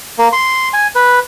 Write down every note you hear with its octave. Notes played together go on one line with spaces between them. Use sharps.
A#3
C6
G#5
B4